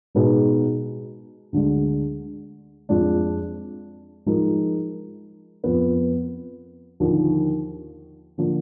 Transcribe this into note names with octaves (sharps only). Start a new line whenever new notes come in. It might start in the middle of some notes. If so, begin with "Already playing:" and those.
B2 G#3 D#4 G#4 B4
D2 D3 G#3
F2 F3 G#3 D4
F3 G#3 D#4 A#4
F2 F3 B3
D#2 D3 F3
D3 F3 A#3